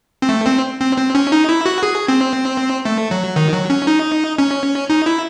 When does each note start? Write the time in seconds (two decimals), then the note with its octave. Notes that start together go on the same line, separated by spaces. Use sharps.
0.22 C4
0.29 A3
0.46 C4
0.80 C4
0.98 C4
1.15 C#4
1.32 D#4
1.49 E4
1.66 F#4
1.83 G#4
2.08 C4
2.85 A3
3.11 F#3
3.36 D#3
3.53 F#3
3.70 C#4
3.87 D#4
4.38 C#4
4.90 D#4
5.06 E4